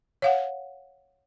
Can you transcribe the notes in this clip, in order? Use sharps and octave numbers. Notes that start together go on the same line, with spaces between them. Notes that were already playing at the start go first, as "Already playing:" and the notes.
C#5 F5 F#5